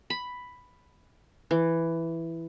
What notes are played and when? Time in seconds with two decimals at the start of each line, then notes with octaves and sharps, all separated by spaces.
0.10 B5
1.51 E3